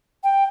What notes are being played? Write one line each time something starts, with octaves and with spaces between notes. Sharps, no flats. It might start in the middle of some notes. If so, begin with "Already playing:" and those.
G5